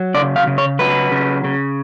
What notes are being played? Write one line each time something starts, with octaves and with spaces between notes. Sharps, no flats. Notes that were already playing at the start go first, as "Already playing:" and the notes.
Already playing: F#3
C#3 D5
F5
C#3
C#5
F#3 B4
C#3
C#3